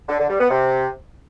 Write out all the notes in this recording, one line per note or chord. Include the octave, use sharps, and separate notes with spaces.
D3
D3
G3
B3
C3